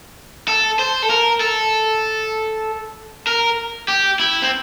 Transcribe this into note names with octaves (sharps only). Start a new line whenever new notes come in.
A4
C5
A4
A#4
A4
A#4
G4
E4
C4